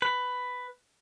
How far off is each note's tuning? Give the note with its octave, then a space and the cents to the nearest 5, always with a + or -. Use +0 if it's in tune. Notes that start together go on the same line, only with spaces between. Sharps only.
B4 +10